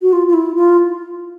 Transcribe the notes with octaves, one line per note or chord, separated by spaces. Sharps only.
F#4
F4
F4
E4
F4